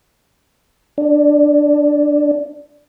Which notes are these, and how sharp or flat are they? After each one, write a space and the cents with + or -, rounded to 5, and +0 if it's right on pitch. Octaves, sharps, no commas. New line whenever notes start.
D4 +5